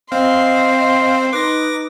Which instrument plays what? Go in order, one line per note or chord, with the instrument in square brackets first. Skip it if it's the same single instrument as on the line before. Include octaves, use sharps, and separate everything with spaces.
[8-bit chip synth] C4 [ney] D#5 [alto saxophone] F5 [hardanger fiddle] C6
[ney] D#4 [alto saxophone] B4 [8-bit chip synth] D6 A#6